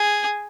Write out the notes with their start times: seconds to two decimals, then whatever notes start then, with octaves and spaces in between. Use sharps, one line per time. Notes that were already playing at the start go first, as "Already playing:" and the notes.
Already playing: G#4